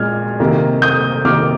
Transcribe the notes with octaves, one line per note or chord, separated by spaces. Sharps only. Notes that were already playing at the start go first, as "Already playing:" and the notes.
Already playing: A#2 G#3 F6 G#6
C3 D#3 A#3
D#6 G6
C3 D#3 A#3 D6 F6